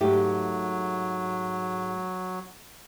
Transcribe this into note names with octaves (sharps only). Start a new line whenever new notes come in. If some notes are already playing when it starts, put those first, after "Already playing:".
G#2 F#3 A3 G4